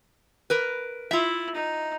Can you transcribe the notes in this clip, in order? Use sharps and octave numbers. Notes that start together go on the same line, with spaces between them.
A#4 B4
E4 F4 E5
D#4